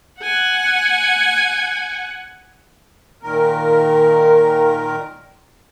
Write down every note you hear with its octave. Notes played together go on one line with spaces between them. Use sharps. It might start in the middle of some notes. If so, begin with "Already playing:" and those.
F#5 G#5
A#2 D#3 A#4